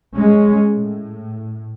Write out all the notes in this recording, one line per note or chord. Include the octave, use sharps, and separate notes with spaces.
G#3 C#4
A2